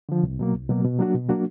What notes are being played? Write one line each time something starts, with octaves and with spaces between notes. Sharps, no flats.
D3 F3
C2
B2 F#3 A#3
C2
B2 F#3 A#3
B2
F#3 A#3 D4 F#4
B2
F#3 A#3 D4 F#4